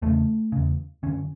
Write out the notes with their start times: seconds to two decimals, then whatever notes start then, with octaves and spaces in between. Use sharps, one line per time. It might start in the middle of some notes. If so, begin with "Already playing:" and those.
0.02 E2 C#3 A3
0.52 E2 C#3
1.03 F#2 D3 C#4